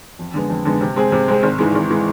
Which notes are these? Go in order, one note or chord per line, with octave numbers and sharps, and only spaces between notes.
F2
D3 G#3 B3
F2
D3 G#3 B3
C3
G#3 C4 G#4
C3
G#3 C4 G#4
G#1
G#2 E3 G#3
G#1
E3 G#3